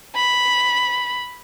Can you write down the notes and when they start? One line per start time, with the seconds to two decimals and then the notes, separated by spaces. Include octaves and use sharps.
0.16 B5